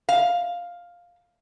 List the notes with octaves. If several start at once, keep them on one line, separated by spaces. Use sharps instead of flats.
F5